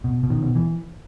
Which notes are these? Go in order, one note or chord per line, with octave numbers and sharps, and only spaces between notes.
B2
B2
D#3
B2
E3